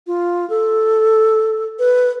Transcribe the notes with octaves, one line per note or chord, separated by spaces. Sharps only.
F4
A4
B4